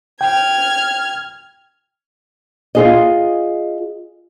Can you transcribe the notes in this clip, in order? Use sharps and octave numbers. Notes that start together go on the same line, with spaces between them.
G5 F6 G#6
F4 G#4 D#5